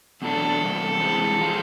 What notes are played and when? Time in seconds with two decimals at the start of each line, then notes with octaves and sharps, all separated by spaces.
0.22 E2 B2 F#3 A3 D4 A4
0.61 E2 C3 G3 A#3
1.00 C3 E3 G#3 C4
1.39 F3 G#3 F4